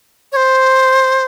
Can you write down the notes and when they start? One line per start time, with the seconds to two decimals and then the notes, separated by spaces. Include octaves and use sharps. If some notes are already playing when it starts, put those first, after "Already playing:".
0.32 C#5
0.36 C5